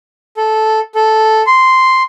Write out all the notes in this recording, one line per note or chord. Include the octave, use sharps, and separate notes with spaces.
A4
A4
C6